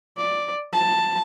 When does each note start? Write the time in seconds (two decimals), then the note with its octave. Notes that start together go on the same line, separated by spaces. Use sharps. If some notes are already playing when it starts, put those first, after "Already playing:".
0.17 D5
0.73 A5